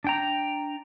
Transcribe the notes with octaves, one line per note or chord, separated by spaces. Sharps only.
D4 G5 A#5